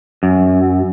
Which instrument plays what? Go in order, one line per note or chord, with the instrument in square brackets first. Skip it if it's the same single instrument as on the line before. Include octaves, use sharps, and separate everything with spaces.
[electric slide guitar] F#2